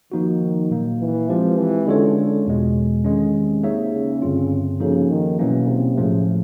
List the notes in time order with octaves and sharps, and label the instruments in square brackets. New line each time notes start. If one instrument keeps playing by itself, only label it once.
[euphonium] D#3 [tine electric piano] F3 A#3 D#4 F#4
[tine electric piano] A#2 F#3 A#3
[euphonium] E3
[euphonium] F3 [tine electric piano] G#3 C4 E4 G4 B4
[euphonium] E3
[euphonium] D3 [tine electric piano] G#3 C#4 F4 A4 C#5
[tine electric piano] E2 B2 G#3
[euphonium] D3 [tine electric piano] D#3 G#3 C#4
[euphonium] C3
[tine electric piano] A#3 D#4 G#4 C#5 E5
[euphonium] C#3
[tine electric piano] G2 D3 G3 C4 F4
[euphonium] C#3 [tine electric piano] F3 A#3 D#4 F#4 A4
[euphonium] D#3
[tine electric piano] B2 F#3 A#3 C#4 [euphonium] E3
[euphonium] C3
[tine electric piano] A2 F3 A3 [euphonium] C#3